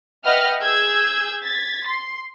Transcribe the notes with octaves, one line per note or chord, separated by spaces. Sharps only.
B4 D#5 E5 F#5 G5 F6
G#4 E6 G6 G#6
G#6 A6 B6
C6